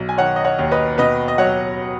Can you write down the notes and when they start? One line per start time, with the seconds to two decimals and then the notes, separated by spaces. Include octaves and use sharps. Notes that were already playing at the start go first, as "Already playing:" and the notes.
Already playing: B1
0.09 G#5
0.18 D#3 C#5 F#5
0.36 D#5
0.44 C#5 F#5
0.59 D#2
0.71 B4 D#5
0.98 B2 B4 D#5
1.28 D#5
1.38 F#3 C#5 F#5